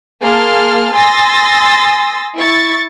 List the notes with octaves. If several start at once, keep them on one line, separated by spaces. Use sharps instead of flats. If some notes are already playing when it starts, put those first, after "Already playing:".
A#3 G#4 A5 C6 F6
G#5 C6 D#6 E6 A6 A#6
E4 C#6 A6